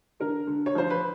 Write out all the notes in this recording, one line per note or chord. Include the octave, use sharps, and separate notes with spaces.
D3 A#4
D3
C#5
F3 C5
B4